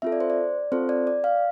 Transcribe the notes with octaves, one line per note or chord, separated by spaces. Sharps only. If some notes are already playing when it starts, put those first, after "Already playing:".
C4 F4 A4 E5
D5
C5
D5
C4 F4 A4 C5
D5
D5
F5